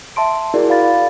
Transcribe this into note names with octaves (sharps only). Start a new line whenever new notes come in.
E5 A5 C6 D7
E4 F#4 G#4 A#4 D5
D5 F5 B5 A6